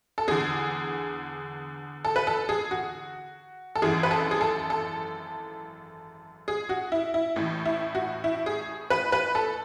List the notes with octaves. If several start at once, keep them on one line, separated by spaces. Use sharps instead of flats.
A4
E2 D3 G#4
A4
B4
A4
G#4
F#4
A4
G#1 F#2 E3 G#4
B4
A4
G#4
A4
A4
G#4
F#4
E4
E4
A1 A2 E3
E4
F#4
E4
G#4
B4
B4
A4